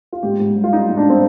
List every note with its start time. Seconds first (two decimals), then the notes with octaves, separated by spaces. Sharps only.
0.13 F4
0.23 G#2 G4
0.40 G#2
0.56 G3
0.64 F4
0.72 G3 D#4
0.89 G#2
0.97 D4
1.06 G3 C4